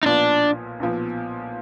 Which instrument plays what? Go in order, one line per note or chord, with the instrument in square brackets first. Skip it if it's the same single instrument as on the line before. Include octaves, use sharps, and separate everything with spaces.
[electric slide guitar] D#4
[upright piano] B1 A#2 F3 B3 [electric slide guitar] D4
[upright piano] B1 A#2 F3 B3